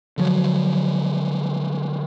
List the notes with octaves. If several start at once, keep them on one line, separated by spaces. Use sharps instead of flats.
D3 F3 F#3